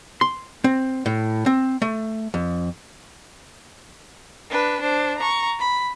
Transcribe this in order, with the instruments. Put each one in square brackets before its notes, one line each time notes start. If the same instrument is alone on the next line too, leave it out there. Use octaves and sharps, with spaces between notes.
[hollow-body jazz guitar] C6
C4
A2
C4
A3
F2
[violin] D4 B4
D4 C5
A#5 C#6
B5